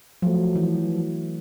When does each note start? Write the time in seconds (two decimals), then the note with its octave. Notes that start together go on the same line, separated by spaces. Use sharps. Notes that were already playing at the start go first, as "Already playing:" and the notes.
0.22 F3 F#3 A3
0.56 E3